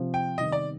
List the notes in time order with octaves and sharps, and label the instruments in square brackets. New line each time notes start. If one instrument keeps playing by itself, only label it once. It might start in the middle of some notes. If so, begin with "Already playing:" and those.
Already playing: [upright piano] C3 F3 C4 G4
[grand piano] G5
[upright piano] C3 D#3 G3 B3 [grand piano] D#5
[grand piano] D5